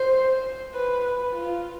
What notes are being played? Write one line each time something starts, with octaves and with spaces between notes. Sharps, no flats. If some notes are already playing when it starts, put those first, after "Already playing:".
Already playing: C5
B4
B4
F4